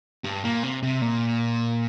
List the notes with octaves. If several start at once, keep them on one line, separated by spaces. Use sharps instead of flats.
G2
A#2
C3
C3
A#2